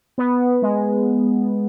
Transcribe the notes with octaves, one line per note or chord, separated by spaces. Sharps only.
B3
G#3